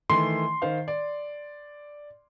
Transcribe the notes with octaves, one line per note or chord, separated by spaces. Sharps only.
D#3 E3 A3 C6
D#3 C5 F5
D5